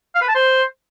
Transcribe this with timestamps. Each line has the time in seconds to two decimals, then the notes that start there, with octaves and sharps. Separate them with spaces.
0.15 F5
0.22 B4
0.28 A5
0.35 C5